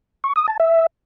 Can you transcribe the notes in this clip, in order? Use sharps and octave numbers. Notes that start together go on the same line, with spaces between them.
C#6
D#6
A5
E5